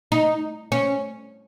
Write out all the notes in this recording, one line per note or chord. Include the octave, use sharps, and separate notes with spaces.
D#4
C#4